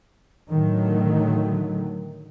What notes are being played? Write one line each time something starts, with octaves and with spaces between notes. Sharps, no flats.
A2 D3 D#3 F#3 A3